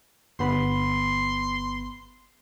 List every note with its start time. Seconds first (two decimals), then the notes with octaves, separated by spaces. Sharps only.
0.39 G1 B3 B5 C6